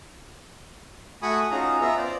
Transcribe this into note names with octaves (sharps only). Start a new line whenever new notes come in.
A3 F#4 G#5 B5 C#6 D#6
C#4 D#4 F4 F#4 G#4 A#5
B3 F4 E5 A#5
C5 D5